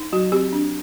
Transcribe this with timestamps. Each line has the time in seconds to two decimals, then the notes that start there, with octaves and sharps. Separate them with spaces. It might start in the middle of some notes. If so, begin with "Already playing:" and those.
Already playing: D#4
0.13 F#3 F#4
0.32 C4 G4
0.53 D4